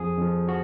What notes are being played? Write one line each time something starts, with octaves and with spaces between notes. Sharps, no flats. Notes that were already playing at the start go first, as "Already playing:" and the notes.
Already playing: F2 F3 G#4
F2 F3
F3 F#4